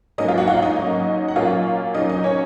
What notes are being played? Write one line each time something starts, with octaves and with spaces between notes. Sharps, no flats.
G#2 F#3 A#3 C#4 D#4 D#5
F4 F5
F#4 F#5
F4 F5
D#4 D#5
G#2 F#3 A#3 C#4
F#5
A#2 F#3 A#3 C#4 F4 F5
A#2 F#3 C#4 D#4 D#5
D#4 D#5
C#4 C#5